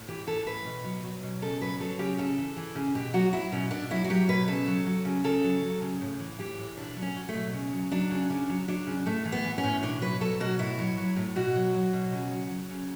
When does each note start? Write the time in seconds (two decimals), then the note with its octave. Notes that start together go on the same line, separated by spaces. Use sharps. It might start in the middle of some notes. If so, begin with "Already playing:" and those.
Already playing: A2
0.08 E3 G4
0.27 E3 A4
0.46 A2 B4
0.65 B2
0.84 F#3
1.03 F#3
1.23 B2
1.42 C#3 A4
1.61 F#3 B4
1.80 F#3 A4
1.99 C#3 G4
2.18 C#3 A4
2.38 E3
2.57 E3
2.75 C#3
2.95 B2 G4
3.13 F#3 F#4
3.33 F#3 E4
3.52 B2 C#4
3.71 B2 D4
3.90 F#3 E4
4.04 F#4
4.10 F#3 G4
4.28 B2 B4
4.48 C#3 A4
4.67 F#3
4.86 F#3
5.05 C#3
5.24 C#3 A4
5.44 F#3
5.62 F#3
5.81 C#3
6.01 A2
6.20 E3
6.39 E3 G4
6.58 A2
6.77 B2 D4
6.96 F#3
7.02 C#4
7.16 F#3
7.29 A3
7.34 B2
7.53 C#3
7.73 F#3
7.91 F#3 D4
8.10 C#3
8.30 C#3 D4
8.49 F#3
8.68 F#3 D4
8.87 C#3
9.06 A2 A3
9.25 E3
9.32 B3
9.45 E3
9.58 C#4
9.63 A2
9.83 B2 D4
10.01 F#3 B4
10.21 F#3 A4
10.40 B2 F#4
10.59 A2 E4
10.78 F#3
10.98 F#3
11.16 A2
11.36 B2 F#4
11.55 F#3
11.74 F#3
11.93 B2
12.12 C#3
12.31 F#3
12.51 F#3
12.69 C#3